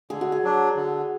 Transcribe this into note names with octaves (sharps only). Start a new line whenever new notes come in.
D3 G#4
F#4
G#4
F#3 D4
D3